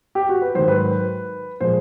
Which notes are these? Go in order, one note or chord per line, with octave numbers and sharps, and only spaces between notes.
G4
F#4
B4
G#2 D#3 F#3 C5
B4
A#2 F3 G#3 C5